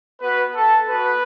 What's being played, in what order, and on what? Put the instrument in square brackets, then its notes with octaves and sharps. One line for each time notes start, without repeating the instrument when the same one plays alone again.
[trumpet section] B3 F#4 B4
A4
B3 F#4 B4